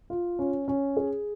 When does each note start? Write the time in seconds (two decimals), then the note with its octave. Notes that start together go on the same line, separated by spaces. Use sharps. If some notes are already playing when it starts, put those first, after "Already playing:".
0.10 F4
0.39 C#4
0.68 C#4
0.97 G#4